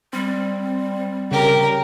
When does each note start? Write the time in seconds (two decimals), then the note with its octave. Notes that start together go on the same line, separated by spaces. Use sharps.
0.13 G3 C4
1.31 C#3 G4 A#4